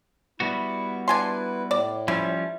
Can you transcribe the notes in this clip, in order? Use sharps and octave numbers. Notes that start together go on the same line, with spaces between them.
G3 B3 E4 F#4
D4 E4 B4 G#5 C6
A2 D5
F3 G3 C#4 E4